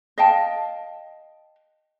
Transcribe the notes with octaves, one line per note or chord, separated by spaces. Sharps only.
D#5 F5 G5 A5